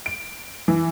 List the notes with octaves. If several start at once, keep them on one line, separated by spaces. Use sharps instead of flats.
D7
E3